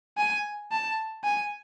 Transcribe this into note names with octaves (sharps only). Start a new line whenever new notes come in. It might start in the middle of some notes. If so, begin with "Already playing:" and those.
G#5
A5
G#5